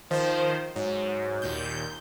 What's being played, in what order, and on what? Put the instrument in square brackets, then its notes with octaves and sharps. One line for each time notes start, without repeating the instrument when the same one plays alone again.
[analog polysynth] D#3 C5 [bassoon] F3
[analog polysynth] G#2 [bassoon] F#3
[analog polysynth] D#2 A#2 G6